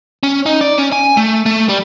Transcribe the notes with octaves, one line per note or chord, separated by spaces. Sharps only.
C#4
D#4
D5
C#4
G#5
A3
A3
G3